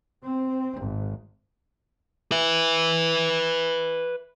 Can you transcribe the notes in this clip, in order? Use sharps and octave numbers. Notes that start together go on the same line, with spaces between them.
C4
G#1
B4 E5